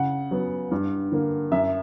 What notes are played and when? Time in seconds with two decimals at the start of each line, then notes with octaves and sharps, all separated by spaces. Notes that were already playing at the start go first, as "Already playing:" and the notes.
Already playing: C#3 F#5
0.31 F#3 B3
0.71 G2
1.12 D3 A#3
1.51 F#2 E5